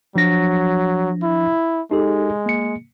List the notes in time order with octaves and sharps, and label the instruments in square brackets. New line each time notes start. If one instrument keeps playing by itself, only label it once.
[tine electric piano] F3 D4 A#6 [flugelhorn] F#3
[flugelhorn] E4
[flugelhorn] G#3 [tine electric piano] D#4 G4 A4
[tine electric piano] A#3 C#7